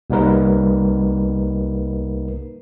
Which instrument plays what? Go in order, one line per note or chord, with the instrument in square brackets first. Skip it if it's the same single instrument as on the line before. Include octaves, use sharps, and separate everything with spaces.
[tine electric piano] C2 G3 A#3 D#4 A#4 B4